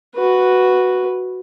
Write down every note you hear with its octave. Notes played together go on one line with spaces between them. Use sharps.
F#4 B4